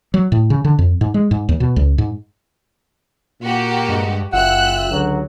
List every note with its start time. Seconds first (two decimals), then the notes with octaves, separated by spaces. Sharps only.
0.14 F#3
0.32 A2
0.50 C#3
0.65 D3
0.79 F2
1.01 G#2
1.14 G#3
1.31 G#2
1.49 D#2
1.60 B2
1.76 C#2
1.98 G#2
3.42 A#2 A#3 F#4 G4
3.89 G2 G#3
4.33 F#1 F4 E5 F#5 G5 E6 F#6
4.90 C#2 D3 F#3